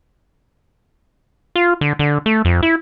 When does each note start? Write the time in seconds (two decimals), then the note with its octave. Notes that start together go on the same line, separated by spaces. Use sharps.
1.55 F4
1.81 D3
1.99 D3
2.26 A3
2.45 F2
2.63 E4